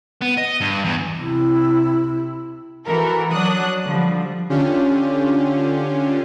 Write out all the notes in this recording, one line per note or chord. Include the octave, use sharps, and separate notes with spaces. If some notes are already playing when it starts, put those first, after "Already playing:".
B3
D#5
G2
E2
C3 E4
E3 F#4 A4 A#4
F#3 D4 D#6 F#6
D3 F3 G3
D3 C#4 D4 F4 G4